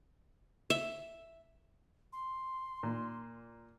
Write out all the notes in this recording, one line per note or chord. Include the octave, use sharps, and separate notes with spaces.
E5
C6
A#2